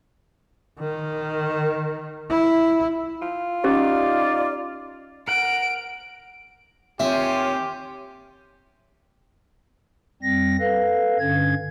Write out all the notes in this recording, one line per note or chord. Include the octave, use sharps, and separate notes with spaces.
D#3
E4
F4
C#4 D#4 G4 D5
A#4 F#5 D7
D#2 C4 F4 G4 C#5 E5 G#5
F2 G3 C4 A#6
A4 B4 F5
G2 D3 C#4 G#6